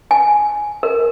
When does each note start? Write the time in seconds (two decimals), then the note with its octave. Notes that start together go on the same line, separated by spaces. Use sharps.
0.11 G#5
0.83 A#4